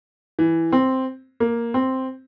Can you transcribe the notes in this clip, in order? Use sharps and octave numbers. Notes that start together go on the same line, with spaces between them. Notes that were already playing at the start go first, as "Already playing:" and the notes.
E3
C4
A#3
C4